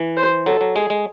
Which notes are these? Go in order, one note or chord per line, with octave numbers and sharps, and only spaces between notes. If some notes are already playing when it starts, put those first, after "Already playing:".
Already playing: E3
C5
F#3 A4
F#3
G#3 G#4
G#3